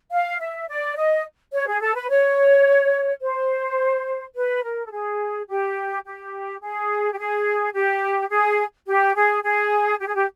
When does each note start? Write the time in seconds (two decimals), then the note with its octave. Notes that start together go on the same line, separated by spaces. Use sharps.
0.12 F5
0.40 E5
0.68 D5
0.97 D#5
1.53 C#5
1.68 G#4
1.81 A4
1.95 B4
2.10 C#5
3.22 C5
4.35 B4
4.63 A#4
4.85 A4
4.91 G#4
5.48 G4
6.05 G4
6.61 G#4
7.12 G4
7.18 G#4
7.74 G4
8.30 G#4
8.87 G4
9.15 G#4
9.44 G#4
10.00 G4
10.07 G#4
10.15 G4